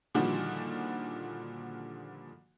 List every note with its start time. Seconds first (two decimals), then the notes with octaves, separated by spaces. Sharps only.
0.15 A#2 D3 D#3 F3 G3 F#4